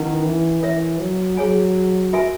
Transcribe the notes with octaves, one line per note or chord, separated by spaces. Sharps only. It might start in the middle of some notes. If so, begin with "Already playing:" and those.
Already playing: D#3 C#4 E4 B4 F#5
E3
E3 A#4 C#5 E5
F#3
F#3 G#4 C#5 G#5
F#4 A#4 E5 G#5